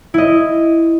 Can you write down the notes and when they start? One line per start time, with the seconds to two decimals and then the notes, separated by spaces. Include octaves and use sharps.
0.14 E4 D#5